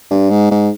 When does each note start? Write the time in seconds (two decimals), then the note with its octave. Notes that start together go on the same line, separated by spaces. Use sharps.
0.11 G2
0.30 G#2
0.51 G#2